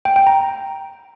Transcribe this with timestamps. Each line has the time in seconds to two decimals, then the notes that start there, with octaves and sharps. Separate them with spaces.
0.05 G5
0.16 G5
0.27 A#5